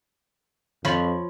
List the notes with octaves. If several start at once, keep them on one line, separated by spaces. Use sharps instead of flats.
F2 F3 C#5 B5